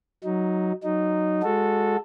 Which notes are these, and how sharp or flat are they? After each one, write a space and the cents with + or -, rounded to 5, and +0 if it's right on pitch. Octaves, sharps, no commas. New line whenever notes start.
F#3 +0 D#4 +5
F#3 +0 D#4 -10
G#3 -5 F#4 -20 A4 +0